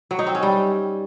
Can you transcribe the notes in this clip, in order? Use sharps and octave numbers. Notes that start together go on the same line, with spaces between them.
F#3
D#4
C4
C#4
G3